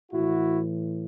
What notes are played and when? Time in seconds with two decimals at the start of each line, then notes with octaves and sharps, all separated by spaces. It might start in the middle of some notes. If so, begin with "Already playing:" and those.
0.12 A2 E3 E4 F#4